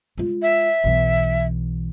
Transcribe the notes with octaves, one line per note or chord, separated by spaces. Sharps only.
G#3 F4
E5
B1 E3